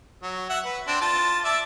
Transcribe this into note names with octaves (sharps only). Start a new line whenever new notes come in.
F#3
E5 F#5
B4
C4 D4
F4 A5
D5 E5 A5